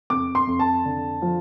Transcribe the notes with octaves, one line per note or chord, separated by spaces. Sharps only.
F2 D6
C6
F2
A5
D3
F3